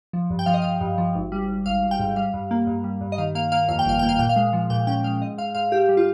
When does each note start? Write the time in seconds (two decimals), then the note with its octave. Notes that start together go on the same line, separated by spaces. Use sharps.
0.13 F3
0.30 G2
0.39 G5
0.46 F3 F5
0.54 D#5
0.62 F3 F5
0.81 G2
0.98 F3
1.15 G#1
1.32 G3
1.49 G#1
1.66 G#1 F5
1.83 G#1
1.91 G5
1.99 G#2
2.16 G3 F5
2.34 G2
2.51 A#3
2.67 G2
2.84 G3
3.01 G2
3.12 D#5
3.18 D#3 F5
3.35 A#3 F5
3.52 A#3 F5
3.68 F2 F5
3.79 G5
3.85 G1 F5
3.99 A#3 G5
4.09 F5
4.19 A#2 G5
4.29 F5
4.36 G#3
4.53 F3
4.70 A#2 G5
4.87 C#4 G5
5.04 G#3 F5
5.21 G#2 D#5
5.38 G#2 F5
5.55 G#2 F5
5.72 G#2 G4
5.89 G3
5.97 F4